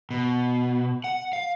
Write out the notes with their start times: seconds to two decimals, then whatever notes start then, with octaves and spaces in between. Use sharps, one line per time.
0.11 B2
1.04 F#5
1.33 F5